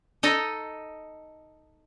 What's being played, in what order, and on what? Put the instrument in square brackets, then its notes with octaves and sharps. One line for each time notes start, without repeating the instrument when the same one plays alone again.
[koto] D#4 A4 D#5